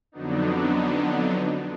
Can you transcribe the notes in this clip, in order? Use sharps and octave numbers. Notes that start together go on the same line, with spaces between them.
F2 D3 F#3 B3 D4 D#4